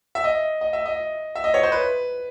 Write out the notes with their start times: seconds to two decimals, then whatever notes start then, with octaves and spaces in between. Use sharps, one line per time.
0.15 E5
0.24 D#5
0.61 D#5
0.73 E5
0.86 D#5
1.35 E5
1.44 D#5
1.54 C#5
1.63 C5
1.72 B4